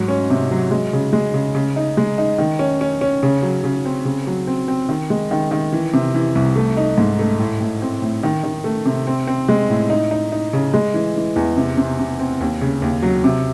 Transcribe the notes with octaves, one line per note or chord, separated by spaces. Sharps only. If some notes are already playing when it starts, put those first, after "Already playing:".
Already playing: G#2 F#3
C#4
C3
F#3
G#3
C#3
G#3
C#3
C#3
D#4
G#3
D#4
D#3
C#4
C#4
C#4
C#3
F#3
C#3
C4
C#3
F#3
C4
C4
D#3
G#3
D#3
D#3
E3
C3
E3
C2
A3
D#4
G#2
A3
A2
A2
C4
A2
D#3
D#3
A3
C3
C4
C4
G#3
A2
D#4
D#4
D#4
C#3
G#3
E3
E3
E2
C3
C3
C3
C4
D#2
C#3
D#2
F#3
C3